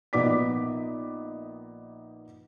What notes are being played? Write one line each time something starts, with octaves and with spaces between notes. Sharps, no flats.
A#1 B3 D#4 D5 D6 B6